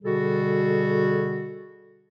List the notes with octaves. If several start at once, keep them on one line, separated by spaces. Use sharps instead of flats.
B2 D3 G3 F#4 G#4 A4